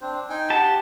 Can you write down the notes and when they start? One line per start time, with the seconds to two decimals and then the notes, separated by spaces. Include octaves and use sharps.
0.01 C4 D4 C5
0.30 D#4 G5 G#5
0.50 G4 F#5 A5